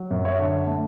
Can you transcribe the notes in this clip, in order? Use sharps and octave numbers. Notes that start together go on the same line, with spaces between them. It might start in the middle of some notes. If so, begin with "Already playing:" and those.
Already playing: F#3
F#2
C#5 E5
D3
A3